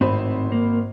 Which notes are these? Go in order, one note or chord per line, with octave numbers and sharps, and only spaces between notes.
G#1 A2 C4 D#4 C5 B5
A#3